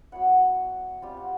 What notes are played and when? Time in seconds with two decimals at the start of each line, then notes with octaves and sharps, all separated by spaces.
0.12 F#3 B3 E4 F#5
1.02 G3 C4 F4
1.17 F#5